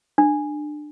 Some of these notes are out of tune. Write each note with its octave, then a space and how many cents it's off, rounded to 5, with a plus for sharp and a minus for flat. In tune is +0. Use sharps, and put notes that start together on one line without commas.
D4 +25